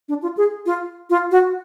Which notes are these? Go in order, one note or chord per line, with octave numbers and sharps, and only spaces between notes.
D4
F4
G#4
F4
F4
F#4